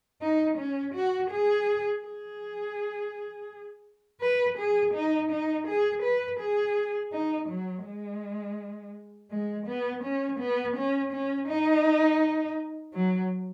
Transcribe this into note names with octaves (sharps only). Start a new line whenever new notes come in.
D#4
C#4
F#4
G#4
G#4
B4
G#4
D#4
D#4
G#4
B4
G#4
D#4
F#3
G#3
G#3
B3
C#4
B3
C#4
C#4
D#4
F#3